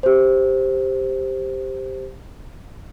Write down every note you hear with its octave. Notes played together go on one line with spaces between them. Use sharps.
G4 C5